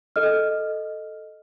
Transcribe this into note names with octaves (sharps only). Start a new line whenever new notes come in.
A4 D#5 F6